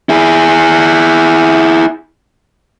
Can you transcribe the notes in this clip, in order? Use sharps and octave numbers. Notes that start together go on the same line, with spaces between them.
E4 G#4